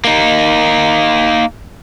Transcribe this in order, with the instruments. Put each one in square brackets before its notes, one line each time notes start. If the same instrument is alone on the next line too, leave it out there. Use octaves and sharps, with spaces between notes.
[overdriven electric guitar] A#3 D#4